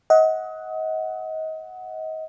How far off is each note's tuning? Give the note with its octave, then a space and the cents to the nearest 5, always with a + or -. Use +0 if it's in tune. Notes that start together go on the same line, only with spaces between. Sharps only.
D#5 +30 F#5 +0